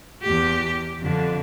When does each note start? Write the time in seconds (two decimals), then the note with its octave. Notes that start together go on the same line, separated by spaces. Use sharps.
0.23 E2 G4
1.00 F2 D3